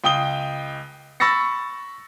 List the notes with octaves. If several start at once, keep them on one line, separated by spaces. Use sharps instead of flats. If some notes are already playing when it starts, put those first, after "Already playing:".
C#2 G5 D#6 G7
B5 C#6 E6 A6 A#6 C#7